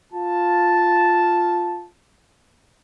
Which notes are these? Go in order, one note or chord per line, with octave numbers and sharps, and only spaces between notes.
F4 A5